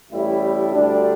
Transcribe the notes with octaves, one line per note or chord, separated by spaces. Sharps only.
A1 A2 G3 E4
D2 D3 G3 D4